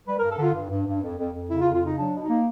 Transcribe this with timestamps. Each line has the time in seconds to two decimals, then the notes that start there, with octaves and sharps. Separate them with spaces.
0.06 G3 B4
0.18 A#4
0.23 G2
0.30 A4
0.38 D3 F4
0.54 G2
0.70 G2
0.86 G2
1.02 F2
1.18 F2
1.33 F2
1.49 C#3 E4
1.61 F4
1.65 F2
1.73 F4
1.80 C#3 D#4
1.97 F#3 D4
2.13 B2
2.21 D#4
2.29 A#3